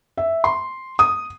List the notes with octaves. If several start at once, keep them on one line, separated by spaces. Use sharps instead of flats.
E5
C6
D#6